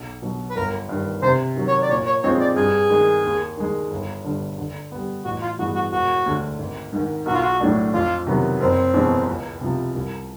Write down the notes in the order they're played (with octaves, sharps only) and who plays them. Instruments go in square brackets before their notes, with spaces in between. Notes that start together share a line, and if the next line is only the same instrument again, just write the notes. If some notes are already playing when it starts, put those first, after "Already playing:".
Already playing: [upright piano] B1
B2 F#3
[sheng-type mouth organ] B4
[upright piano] G1 [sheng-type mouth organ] A#4
[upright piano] G2 D#3
[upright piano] C3 [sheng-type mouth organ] C5
[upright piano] D#3 F#3
[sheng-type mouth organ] C#5
D5
[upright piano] A#2 [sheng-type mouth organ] C#5
[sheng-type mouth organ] C#5
[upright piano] F3 G#3 C4 D#4 [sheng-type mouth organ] C#5
[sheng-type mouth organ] D5
[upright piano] G2 [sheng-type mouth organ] G#4
[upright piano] D#3 G#3
D#2
D#3 G#3
G1
G2 D3
D3
G3 B3
[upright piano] A1 [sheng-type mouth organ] F#4
[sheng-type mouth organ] F4
[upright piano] G2 E3 G#3 B3 [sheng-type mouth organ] F#4
[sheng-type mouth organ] F#4
[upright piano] E1 [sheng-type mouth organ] F#4
[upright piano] D2 D3
G#1
G#2 D#3
[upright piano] B1 [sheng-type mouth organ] F#4
[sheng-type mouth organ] F4
F#4
[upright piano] A2 F#3 A3 D4
[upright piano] F2 [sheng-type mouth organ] F4
[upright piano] C3 D#3 F#3 B3
[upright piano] F#1 [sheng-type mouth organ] C4
[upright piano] E2 B2 G#3 C#4
C#2
C3 F3
C2